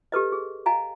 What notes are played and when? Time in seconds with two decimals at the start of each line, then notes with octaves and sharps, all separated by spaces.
0.12 G4 A4 B4 D#5
0.32 G#4
0.66 D#5 F5 G#5 A#5